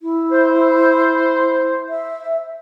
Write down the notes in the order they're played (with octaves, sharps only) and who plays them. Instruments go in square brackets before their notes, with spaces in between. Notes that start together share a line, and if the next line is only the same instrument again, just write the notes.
[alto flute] E4
[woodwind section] C5
[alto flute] E5